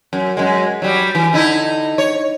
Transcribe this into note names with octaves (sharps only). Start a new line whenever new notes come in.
F#2
F#2 G#3
F#3 G3
E3
D3 D#4 E4
C#5